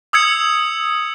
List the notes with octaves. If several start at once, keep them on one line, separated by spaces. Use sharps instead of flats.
D#6 E6 G#6 C#7